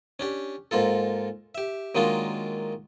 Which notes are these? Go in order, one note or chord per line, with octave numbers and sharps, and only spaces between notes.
C#4 D4 G4
G#2 A#3 F4 A4
G4 E5
D#3 F#3 G#3 A#3 D4 F4